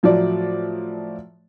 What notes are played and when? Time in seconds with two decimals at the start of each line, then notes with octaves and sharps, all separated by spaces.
0.03 A2 F3 F#3 A3 D5